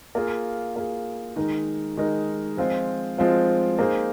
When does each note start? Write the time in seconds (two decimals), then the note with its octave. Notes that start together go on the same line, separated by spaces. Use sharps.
0.15 A#3 F4 G#4
0.76 A#3 F4 G#4
1.36 D#3 G#3 D#4 A#4
1.97 D#3 G#3 D#4 A#4
2.57 F3 G#3 C4 F4 C5
3.18 F3 G#3 C4 F4 C5
3.79 A#3 D#4 G#4 C5